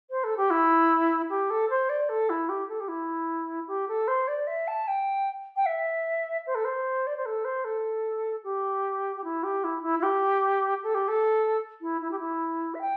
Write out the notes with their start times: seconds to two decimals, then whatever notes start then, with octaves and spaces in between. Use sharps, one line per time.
0.10 C5
0.24 A4
0.37 G4
0.50 E4
1.29 G4
1.50 A4
1.70 C5
1.89 D5
2.09 A4
2.29 E4
2.49 G4
2.68 A4
2.80 G4
2.88 E4
3.67 G4
3.88 A4
4.07 C5
4.27 D5
4.47 E5
4.67 A5
4.87 G5
5.56 G5
5.66 E5
6.46 C5
6.55 A4
6.64 C5
7.06 D5
7.17 C5
7.25 A4
7.44 C5
7.64 A4
8.44 G4
9.16 G4
9.24 E4
9.43 G4
9.64 E4
9.83 E4
9.99 E4
10.03 G4
10.83 A4
10.94 G4
11.08 A4
11.81 E4
12.01 E4
12.11 G4
12.19 E4
12.74 E5
12.81 G5